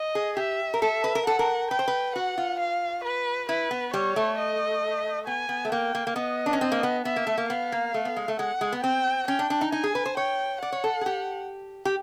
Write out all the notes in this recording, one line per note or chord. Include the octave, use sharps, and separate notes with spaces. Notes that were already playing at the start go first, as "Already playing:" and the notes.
Already playing: D#5
G#4
G4 E5
A#4
A4 E5
B4
A#4
A4 F#5
A#4
B4 G5
C5
B4
F#4 F#5
F4
F5
B4
E4 B4
B3
G3 C#5
A3
D#5
B3 G#5
B3
A3
A#3 G5
A#3
A#3
B3 D#5
D4
C#4
C4
A#3
B3
B3 E5
A#3
A3
A#3
B3 F5
A#3
A3
B3
G#3
A3
G#3 F#5
G#3
B3
C4 G5
C#4 G5
D4
D4
D#4
D#4 G#5
G#4
B4
C5
C#5 G5
D5 F#5
C#5
A4
G#4
G4
G4